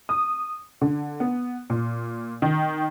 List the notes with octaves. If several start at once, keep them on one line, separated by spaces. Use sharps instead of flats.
D#6
D3
B3
A#2
D#3